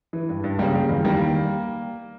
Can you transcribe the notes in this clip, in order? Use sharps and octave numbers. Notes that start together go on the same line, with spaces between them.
E3
G2
G2
C#3 G3 A#3
G3
E2
D#3 G3 A#3